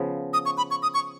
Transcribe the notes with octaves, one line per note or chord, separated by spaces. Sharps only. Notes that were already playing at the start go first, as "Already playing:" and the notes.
Already playing: C#3 F3 B3
D#6
C#6
B5
C#6
D#6
C#6